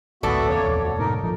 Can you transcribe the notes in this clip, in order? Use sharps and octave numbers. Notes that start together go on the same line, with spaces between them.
A1 D2 G#2 B3 F#4 A4 D5 E5
E2 C#3 A#3 C#5
D#1 F2
D2
G#2 B2 D3 D#4 A#4
A1 F3 D#4